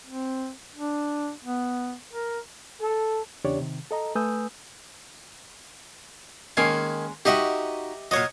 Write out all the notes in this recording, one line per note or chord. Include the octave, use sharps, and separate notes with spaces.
C4
D4
B3
A#4
A4
E2 C#3 D4 G4 C#5 D5
C3 D#3
A4 D#5 A#5
A3 B4 G#5 D#6 E6 G6
D#3 G#3 A#3 C#4 G#5
D#4 F#4 G4 D#5 E5
A#2 F#3 C#5 D#5